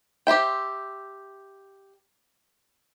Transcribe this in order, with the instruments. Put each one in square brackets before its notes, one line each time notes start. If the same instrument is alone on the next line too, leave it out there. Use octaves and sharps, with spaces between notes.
[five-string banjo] G4 C5 E5 G5